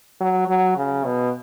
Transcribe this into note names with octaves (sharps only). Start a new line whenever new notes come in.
F#3
F#3
C#3
B2